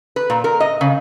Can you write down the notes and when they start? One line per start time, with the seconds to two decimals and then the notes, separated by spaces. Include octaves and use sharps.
0.16 B4
0.30 A#2
0.44 A#4
0.60 D#5
0.81 C#3